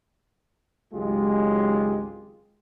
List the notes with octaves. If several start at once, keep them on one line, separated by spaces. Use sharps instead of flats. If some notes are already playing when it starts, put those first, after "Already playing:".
G#1 C#2 F#3 G#3 F4 G4